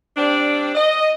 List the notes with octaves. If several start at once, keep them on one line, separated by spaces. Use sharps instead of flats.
G3 C4 D4
D#5